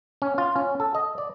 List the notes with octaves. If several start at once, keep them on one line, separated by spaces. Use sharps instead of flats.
C#4
F4
C#4
A4
D#5
D5